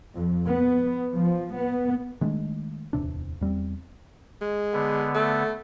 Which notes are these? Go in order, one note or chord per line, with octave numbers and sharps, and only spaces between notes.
F2
B3
F3
B3
D#3 G#3 A3 D4
D1 E2 C3 D4
E2 G3 A#3 C4
G#3
D3 B3
A3